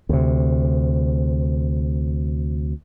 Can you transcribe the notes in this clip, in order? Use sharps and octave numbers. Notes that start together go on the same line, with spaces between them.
D2 C3